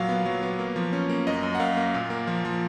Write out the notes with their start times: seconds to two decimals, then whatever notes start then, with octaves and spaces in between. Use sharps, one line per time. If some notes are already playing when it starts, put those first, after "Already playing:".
Already playing: A#2 F#3 F5
0.09 B3
0.26 F#3
0.43 B3
0.59 A#3
0.76 F3
0.93 C#4
1.09 A#3
1.27 F#2 D#5
1.43 F#2
1.55 F#5
1.60 F#2 F5
1.77 A#3
1.94 A#2
2.10 A#3
2.27 F3
2.45 F3